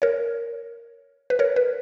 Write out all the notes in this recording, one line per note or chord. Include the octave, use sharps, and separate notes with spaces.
A#4 C#5
B4
A#4 C#5
B4